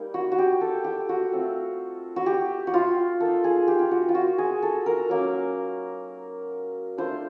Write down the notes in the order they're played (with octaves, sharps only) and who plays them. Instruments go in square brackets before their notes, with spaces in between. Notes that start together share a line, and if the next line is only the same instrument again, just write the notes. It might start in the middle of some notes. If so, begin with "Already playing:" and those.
Already playing: [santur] G3 A#3 D#4
F#4
F#4
G4
A4
G4
F#4
A3 C4 F4
F#4
G4
F#4
F4
A#3 A4
D#4
G#4
G4
F4
F#4
F4
F#4
G#4
A4
A#4
F#3 A#3 C#4
A3 D4 F4 C5